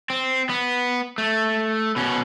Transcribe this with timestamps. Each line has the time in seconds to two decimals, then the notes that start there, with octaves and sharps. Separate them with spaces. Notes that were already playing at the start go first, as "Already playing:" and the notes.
0.10 C4
0.50 B3
1.18 A3
1.96 B2 C#4